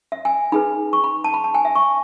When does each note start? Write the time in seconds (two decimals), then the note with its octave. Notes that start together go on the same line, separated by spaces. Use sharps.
0.12 E5
0.25 G#5
0.52 D#4 G#4 B4 B5
0.93 C#6
1.04 B5
1.24 A5
1.34 B5
1.44 A5
1.55 G#5
1.65 E5
1.75 C#6